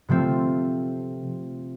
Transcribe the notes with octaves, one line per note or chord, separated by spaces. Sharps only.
C3 F3 A3 C4 F4